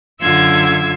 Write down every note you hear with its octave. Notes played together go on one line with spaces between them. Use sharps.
F#2 D3 F4 E5 E6 G#6